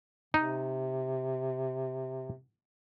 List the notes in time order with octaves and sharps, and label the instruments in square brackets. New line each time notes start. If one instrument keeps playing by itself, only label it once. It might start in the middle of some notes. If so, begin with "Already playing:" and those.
[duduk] C3 [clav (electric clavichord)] D#4